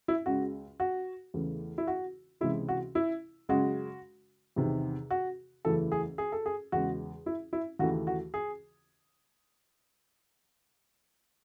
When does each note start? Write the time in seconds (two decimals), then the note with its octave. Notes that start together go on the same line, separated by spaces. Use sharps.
0.08 E4
0.26 C#2 C#3 G#3 F#4
0.80 F#4
1.34 E2 C#3 E3 A3
1.78 E4
1.87 F#4
2.41 C#2 C3 E3 G#3 E4
2.69 F#4
2.95 E4
3.49 F#2 C#3 G#3 F#4
4.56 E2 C3 D#3
5.10 F#4
5.65 F#1 E2 C#3 E3 A3 A4
5.92 G#4
6.18 G#4
6.32 A4
6.46 G#4
6.72 E2 C#3 G#3 F#4
7.26 E4
7.53 E4
7.79 D#2 C#3 E3 A3 F#4
8.07 F#4
8.34 G#4